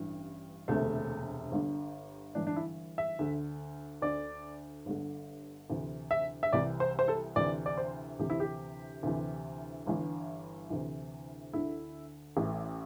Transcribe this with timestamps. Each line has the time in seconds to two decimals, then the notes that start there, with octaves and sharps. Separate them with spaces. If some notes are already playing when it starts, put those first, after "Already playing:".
Already playing: A1 G2 E3
0.68 E1 D2 C3 A3
1.52 G1 G2 D3
2.35 G1 G2 E3 D4
2.47 D4
2.56 E4
2.98 E5
3.19 D2 D3
4.02 D2 D3 D5
4.86 G1 G2 D3
5.70 D2 C3 E3
6.11 E5
6.43 E5
6.53 C2 C3 E3 D5
6.80 C5
6.99 C5
7.08 A4
7.36 D2 C3 E3 D5
7.66 D5
7.78 C5
8.19 D2 C3 E3 G4
8.30 E4
8.40 G4
9.03 D2 C3 E3
9.87 G1 G2 E3
10.70 D2 C3 E3
11.53 D2 D3 E4
12.37 A1 A2 E3